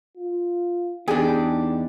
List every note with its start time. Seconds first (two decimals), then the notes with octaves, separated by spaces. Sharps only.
0.17 F4
1.08 E2 D4 D#4 G4 G#4 G#5